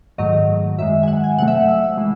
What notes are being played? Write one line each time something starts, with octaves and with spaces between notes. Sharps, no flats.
G#2 D#3 F#3 A3 D#5
F#2 D#3 G#3 E5
G#5
F#5
G#5
C3 F#3 A3 F#5
E5
F#5
E6
E3 G#3